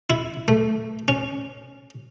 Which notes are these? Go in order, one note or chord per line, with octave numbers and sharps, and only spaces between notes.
E4
A3
C#4